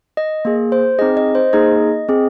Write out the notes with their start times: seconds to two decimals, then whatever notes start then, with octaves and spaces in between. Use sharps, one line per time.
0.17 D#5
0.45 A#3 G#4
0.72 C5
0.99 C4 D#4 G#4 D#5
1.17 D#5
1.35 C5
1.53 A#3 D#4 G#4 D#5
2.08 C4 G#4